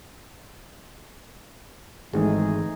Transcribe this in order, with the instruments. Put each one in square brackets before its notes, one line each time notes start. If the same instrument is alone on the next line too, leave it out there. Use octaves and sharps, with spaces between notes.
[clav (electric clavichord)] G#1 [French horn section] E3 [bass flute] G#3 [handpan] A3 D#4 G#4